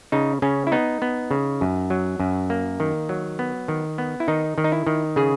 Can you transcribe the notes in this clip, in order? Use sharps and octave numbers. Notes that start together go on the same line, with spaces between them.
C#3 D#4
C#3 C#4
E4
B3 D#4
B3
C#3
F#2
F#3
F#2
A#3
D#3
F#3
B3
D#3
B3
E4
D#3 D#4
D#3
D#4
E4
D#3
C#3 G#4